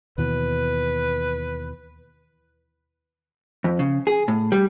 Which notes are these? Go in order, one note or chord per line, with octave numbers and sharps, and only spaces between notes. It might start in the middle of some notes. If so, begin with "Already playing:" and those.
D#2 B2 E3 B4
F2
C#3
G#4
A2
G3